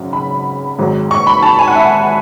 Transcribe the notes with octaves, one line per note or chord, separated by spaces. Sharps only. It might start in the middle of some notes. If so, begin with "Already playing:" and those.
Already playing: G#1 F#2 C#3
B5
G#1 G#2 D#3 F#3
C#6
B5
A5
G#5
F#5
E5